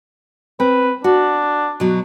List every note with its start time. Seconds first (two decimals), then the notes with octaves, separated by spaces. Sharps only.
0.60 C4 B4
1.04 D4 F#4
1.80 B2 F#3